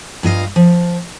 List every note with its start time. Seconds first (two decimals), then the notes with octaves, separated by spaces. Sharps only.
0.23 G2 F4 D#5 F5
0.56 F3